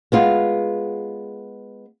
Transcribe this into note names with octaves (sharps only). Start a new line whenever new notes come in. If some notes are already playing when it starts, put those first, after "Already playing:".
G#3 B3 F4